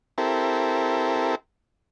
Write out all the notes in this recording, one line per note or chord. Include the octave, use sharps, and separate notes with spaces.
C4 E4 G4 A4 A#4